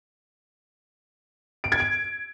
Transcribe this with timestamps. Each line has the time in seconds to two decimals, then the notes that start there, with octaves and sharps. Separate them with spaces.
1.64 D7
1.72 G#6
1.80 D7